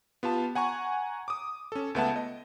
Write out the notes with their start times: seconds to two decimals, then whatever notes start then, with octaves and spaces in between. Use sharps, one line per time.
0.23 B3 F4 G4 A5
0.55 F#5 G#5 A#5 C#6
1.28 D6 D#6
1.72 C#4 A4
1.95 C#2 A3 B3 E5 F#5 A5
2.16 D#5